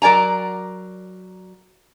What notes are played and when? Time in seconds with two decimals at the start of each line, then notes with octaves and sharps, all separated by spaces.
0.02 F#3 A#4 D5 G#5 A#5